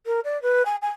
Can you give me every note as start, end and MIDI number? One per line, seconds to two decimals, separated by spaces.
0.06 0.20 70
0.24 0.41 74
0.42 0.63 71
0.66 0.76 80
0.82 0.90 80